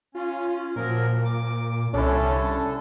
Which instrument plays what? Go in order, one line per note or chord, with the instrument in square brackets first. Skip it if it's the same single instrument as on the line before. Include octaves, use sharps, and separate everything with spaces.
[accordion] C#4 [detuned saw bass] F4
[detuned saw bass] A#2 [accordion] F3 F#3 A#4
[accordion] D6
[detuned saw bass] C2 [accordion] D3 A4 [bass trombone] C#4 [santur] D4 E4